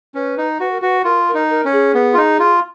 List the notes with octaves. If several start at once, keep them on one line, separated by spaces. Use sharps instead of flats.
C#4 B4
D#4
F#4 B4
A#4
F#4 B4
F4 A#4
A#4
D#4
A#4
C#4
G#4
B3
F4
D#4
F4